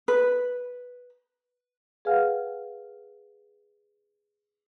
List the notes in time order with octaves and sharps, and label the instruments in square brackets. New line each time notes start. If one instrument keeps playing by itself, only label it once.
[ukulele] B4
[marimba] G#4 B4 F5 F#5 G#5 F6